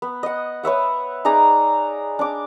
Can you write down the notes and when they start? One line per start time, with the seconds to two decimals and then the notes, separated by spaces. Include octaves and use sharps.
0.02 B3
0.23 D#5 F#5
0.63 B4 C#5 E5 F#5
1.25 D#4 G#4 D5 A#5
2.19 D4 D6